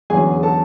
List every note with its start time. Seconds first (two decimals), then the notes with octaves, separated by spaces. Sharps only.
0.10 E2 D3 F#3 C#4 G#4 G#5
0.43 A4 A5